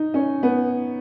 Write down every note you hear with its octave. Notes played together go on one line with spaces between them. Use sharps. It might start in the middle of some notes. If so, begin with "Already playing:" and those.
Already playing: D#4
C#4
B3